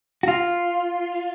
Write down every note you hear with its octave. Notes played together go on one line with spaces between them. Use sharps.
F#4
F4